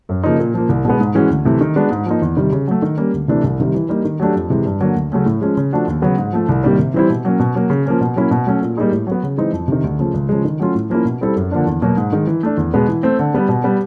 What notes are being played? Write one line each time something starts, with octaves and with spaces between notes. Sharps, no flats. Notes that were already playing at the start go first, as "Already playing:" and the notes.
F#2
C#3 F3 A#3 D#4
A#2
F3 A#3
C2
B2 G#3 B3
G#2
E3 G#3 C#4 F#4
D2
C3 E3 A3
D#3
G#3 B3 D4 F#4
G#2
F3 A#3 D#4
E2
C3 D#3 G3
C#3
F#3 A3
D#3
G3 A#3 C#4
D2
C3 E3 A3 D4
C2
C3 D#3 G3
E3
G3 A#3 D#4
D#3
F#3 A3 D4 G4
F2
C3 E3 G#3
G2
D3 F#3 A#3
D2
C#3 F#3 A3 C#4
A2
F3 G#3 C#4
C#3
F3 A3 D4 F#4
D#2
C#3 F#3 B3
G#2
F3 A3
C2
C3 D#3 G3 A#3
C3
E3 G3 C4 E4
B2
F#3 A#3 C#4
B2
F#3 A#3
C#3
F3 A#3 C#4
B2
F#3 A#3 C#4 E4
B2
F#3 A3 C#4
A#2
G3 A#3 D#4 G#4
A2
F#3 B3
C#3
E3 G#3 C4 D#4
F2
C3 D#3
D2
C#3 F3 A3
C#2
C#3 F3 G#3
D#3
F#3 A3 C#4 F4
A2
F3 A#3 C#4 E4
B2
G3 C4 E4 A4
F#2
D3 F3 A#3 D4
E2
B2 F#3 A#3
G#2
D#3 G#3
E3
A3 D4
E2
B2 G#3 B3
E3
A3 C4
D3
G3 B3
B2
G3 B3